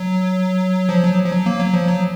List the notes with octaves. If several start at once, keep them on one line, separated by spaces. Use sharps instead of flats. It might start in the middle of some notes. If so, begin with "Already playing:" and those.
Already playing: F#3
F3
F#3
F3
F#3
A#3
F#3
F3
F#3